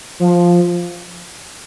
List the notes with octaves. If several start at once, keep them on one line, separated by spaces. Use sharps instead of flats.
F3